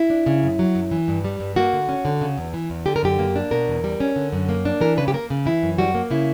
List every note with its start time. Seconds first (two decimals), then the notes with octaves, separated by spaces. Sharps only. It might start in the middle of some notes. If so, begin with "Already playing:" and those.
Already playing: E4
0.10 D4
0.26 C#3
0.43 F#2
0.59 F#3
0.75 F#2
0.91 E3
1.08 G2
1.25 G3
1.40 G2
1.56 A#3 F#4
1.73 D3
1.89 C#4
2.05 D3
2.21 C#3
2.38 E2
2.54 E3
2.70 E2
2.86 D3 G4
2.96 A#4
3.03 F#2 G4
3.19 A#3
3.36 D4
3.51 B2 A#4
3.68 E2
3.84 G3
4.00 C#4
4.16 D3
4.32 F#2
4.49 A#3
4.65 D4
4.81 E3 A#4
4.97 C#3 B4
5.08 G4
5.13 A#3 A#4
5.30 C#3
5.46 E3 E4
5.63 F#2
5.78 G3 F#4
5.95 A#3
6.11 C#3 E4